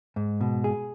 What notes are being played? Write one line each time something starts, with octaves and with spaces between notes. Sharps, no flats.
G#2
B2
G#4